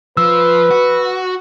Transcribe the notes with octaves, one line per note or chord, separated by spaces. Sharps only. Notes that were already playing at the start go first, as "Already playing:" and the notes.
F3 B4 E6
F#4